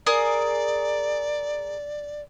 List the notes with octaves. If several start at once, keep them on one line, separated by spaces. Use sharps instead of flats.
G#4 A#4 D5 D#6